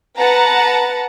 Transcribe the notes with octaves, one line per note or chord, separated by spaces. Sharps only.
B4 F#5 A5 A#5